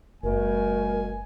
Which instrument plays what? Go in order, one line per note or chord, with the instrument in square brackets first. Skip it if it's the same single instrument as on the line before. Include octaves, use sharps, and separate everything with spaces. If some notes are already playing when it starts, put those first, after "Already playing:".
[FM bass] F#1 [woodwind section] B2 G3 A3 [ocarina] A#4 [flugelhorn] G#5